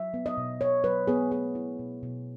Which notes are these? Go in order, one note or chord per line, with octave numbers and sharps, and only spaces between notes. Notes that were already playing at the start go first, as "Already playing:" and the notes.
Already playing: F#3 E5
B3
D#5
B2
B2 C#5
F#3 B4
B3 G#4
A3 G#4
E4
B2
B2